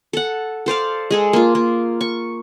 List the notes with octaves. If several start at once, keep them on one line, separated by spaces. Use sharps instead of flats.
A4 F#5
A4 C5 D5 F5
G#3 G#4 A4
A#3 F4
A#3
C#6